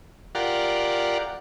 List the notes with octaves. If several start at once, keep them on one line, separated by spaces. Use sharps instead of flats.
F4 G4 A#4 D5 F#5